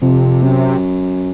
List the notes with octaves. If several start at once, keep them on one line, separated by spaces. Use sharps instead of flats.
F2 C3
F#2